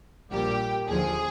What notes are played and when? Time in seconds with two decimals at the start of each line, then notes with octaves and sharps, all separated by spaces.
0.31 A#1 A#2 G3 A#3 G4
0.88 D#2 D3 F3 G#4